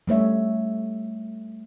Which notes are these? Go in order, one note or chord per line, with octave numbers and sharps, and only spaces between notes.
G3 A3 C#5 E5